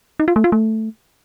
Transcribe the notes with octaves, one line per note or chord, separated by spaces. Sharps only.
D#4
F4
A3
F4
A3